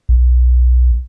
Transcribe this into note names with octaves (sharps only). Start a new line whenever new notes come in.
B1